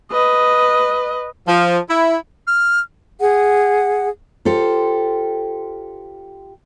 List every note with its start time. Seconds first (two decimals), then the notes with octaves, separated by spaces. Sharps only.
0.11 B4 D#5
1.47 F3
1.89 E4
2.47 F6
3.20 G#4 F#5
4.45 F4 G4 A4 C5